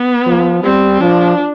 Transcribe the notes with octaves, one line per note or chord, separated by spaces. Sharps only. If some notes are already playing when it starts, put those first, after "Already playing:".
Already playing: B3
F3
G3 C4
F3 D4